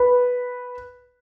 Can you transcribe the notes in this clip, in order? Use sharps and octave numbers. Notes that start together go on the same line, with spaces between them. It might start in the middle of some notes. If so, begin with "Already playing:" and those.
Already playing: B4